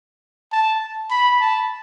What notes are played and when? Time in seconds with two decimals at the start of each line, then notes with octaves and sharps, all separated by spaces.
0.52 A5
1.11 B5
1.40 A5